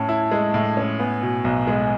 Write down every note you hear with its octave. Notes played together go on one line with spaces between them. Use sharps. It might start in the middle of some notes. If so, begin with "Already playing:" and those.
Already playing: A2 C#4 A5
E4
G#3
A2
C#4
B3 G#5
B2
B1
G#3